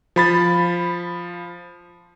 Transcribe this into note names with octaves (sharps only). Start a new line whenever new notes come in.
F3 B5 A6